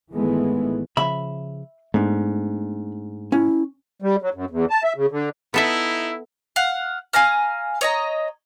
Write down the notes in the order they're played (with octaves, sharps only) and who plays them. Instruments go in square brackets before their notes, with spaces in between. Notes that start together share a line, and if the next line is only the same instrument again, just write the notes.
[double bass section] G#1 D#3 E3 G#3 A3 B3
[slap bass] C#3 F3 [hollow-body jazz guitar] E5 B5
[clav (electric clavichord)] G#2 [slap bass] A3 B3 D4
[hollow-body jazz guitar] C#4 [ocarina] E4
[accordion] G3
F#3
F#2
E2
A5
E5
C#3
D3
[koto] B3 A4 E5 [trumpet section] D#4 E4
[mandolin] F5 F#5
F5 G#5 A#5 F6
C#5 D#5 A#5